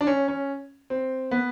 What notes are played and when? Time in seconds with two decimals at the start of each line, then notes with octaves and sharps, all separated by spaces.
0.01 D4
0.07 C#4
0.28 C#4
0.90 C4
1.31 B3